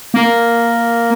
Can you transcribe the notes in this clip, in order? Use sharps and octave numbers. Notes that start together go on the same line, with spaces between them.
A#3